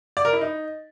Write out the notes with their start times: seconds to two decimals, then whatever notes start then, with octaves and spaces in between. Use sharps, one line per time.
0.17 D5
0.25 A#4
0.33 E4
0.41 D#4